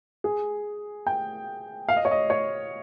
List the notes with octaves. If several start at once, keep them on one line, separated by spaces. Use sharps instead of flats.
G#4
G5
F5
D#5
C#5
D#5
C#5